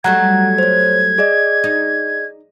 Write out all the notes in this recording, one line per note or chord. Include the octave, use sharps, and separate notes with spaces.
F#3 G3 A3 F#5 A#5 F#6 G#6
C5 C#5
G#4 D5 D#5
D#4